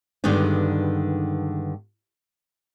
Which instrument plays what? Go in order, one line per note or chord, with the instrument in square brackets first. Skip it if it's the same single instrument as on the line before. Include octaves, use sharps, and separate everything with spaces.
[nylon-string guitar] G2 D3 D#3 G#3 B3 D#4